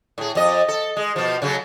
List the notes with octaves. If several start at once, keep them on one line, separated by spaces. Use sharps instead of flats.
A2 G#4
F2 D#5
A4
G#3
B2 F3
C#3 F#3 A3